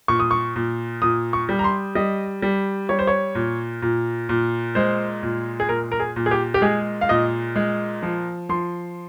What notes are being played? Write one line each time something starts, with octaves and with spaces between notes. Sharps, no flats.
A#2 C#6
D#6
C#6
A#2
A#2 D#6
C#6
G3
A#5
C6
G3 D#5
G3
G3 C#5
C5
C#5
A#2
A#2
A#2
G#3 C5
A#2
G#4
A#2 A#4
A#4
G#4
A#2
G#4
G4
G4
G#3 G#4
F5
A#2 D#5
G#3
F3
F3 C6